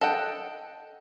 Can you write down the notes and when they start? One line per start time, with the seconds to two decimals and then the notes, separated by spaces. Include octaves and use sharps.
0.01 A4 D#5 F#5 G5